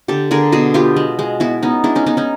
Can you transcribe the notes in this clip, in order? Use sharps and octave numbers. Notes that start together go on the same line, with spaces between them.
D3 G4 A4
D3 G#4 A#4
B2 F#4 G#4
B3 F4 G4
G#3
G#3
B3 E4 F#4
B3 C#4 D#4
G#3 D4 E4
C#4 D#4
B3 C#4 D#4
C#4 D#4